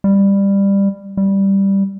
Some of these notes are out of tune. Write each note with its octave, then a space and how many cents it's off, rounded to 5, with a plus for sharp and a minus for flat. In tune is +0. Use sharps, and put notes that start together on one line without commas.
G3 +15
G3 +0